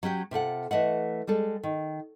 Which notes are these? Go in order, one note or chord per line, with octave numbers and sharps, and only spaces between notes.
F#3 C#4 G4 G5
C3 F4 A4 F#5
E3 A3 D#5 F#5
G3 G#3 A4
D#3